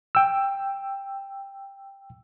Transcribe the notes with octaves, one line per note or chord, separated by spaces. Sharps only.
G5 E6